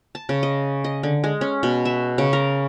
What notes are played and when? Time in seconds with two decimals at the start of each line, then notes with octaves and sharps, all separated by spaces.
0.15 A5
0.29 C#3
0.43 D#5
0.84 D#5
1.03 D3
1.24 G#3
1.41 C#4
1.63 B2
1.85 E5
2.18 C#3
2.33 A#4